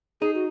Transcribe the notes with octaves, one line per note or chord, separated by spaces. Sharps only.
D#4 G#4
F#4